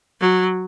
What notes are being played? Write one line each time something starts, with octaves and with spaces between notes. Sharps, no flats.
F#3